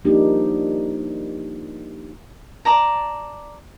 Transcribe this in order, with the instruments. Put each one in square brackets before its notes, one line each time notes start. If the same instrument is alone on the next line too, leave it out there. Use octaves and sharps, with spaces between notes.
[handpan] F3 G3 A#3 D4 D#4 G4
[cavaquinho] D5 A5 A#5